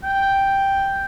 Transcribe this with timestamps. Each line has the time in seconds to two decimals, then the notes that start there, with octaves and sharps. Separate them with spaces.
0.04 G5